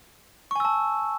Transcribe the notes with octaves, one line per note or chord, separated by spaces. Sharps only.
G#5 A5 C#6 E6